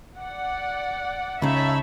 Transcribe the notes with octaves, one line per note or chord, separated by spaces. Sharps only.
D5 F#5
C#2 C#3 D#4 C#5 E5 A5 B5